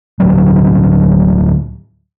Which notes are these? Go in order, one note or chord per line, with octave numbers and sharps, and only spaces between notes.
D2 A2 F#3 G3